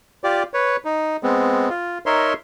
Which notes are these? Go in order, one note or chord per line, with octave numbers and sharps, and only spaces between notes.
F4 G4 D5
B4 C#5
D#4
G#3 B3 C4
F4
D#4 A#4 C#5 E5 C6